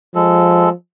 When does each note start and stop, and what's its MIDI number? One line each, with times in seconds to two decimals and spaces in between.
0.15 0.72 53
0.15 0.69 56
0.15 0.69 69